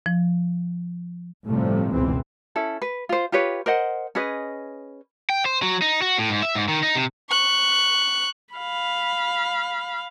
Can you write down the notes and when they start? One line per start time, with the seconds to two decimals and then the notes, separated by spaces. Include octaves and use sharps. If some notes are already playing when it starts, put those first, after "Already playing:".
0.06 F3
1.48 G1 A2 C3 F3 G3 A3
1.92 F#1 C#2 B2 E3 G#3 C4
2.56 C#4 E4 A4
2.82 B4
3.09 F4 C5
3.32 F4 G4 B4 C#5
3.66 A#4 C5 D#5 F#5
4.15 C#4 G#4 B4 D#5
5.30 G5
5.46 C5
5.62 F#3
5.82 D#4
6.02 F#4
6.19 A2
6.30 G#2
6.43 E5
6.55 G#2
6.68 D#3
6.83 D#4
6.95 C3
7.30 C#6 F#6
8.54 F5 B5